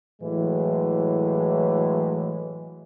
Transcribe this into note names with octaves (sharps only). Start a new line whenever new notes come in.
A2 E3 F#3 G#3